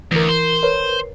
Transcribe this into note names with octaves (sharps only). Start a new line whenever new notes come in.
D2 E3 A#4
C5
A#4 B4 C#5